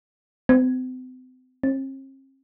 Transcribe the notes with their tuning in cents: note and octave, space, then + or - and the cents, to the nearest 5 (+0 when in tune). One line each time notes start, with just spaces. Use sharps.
C4 -40
C4 +45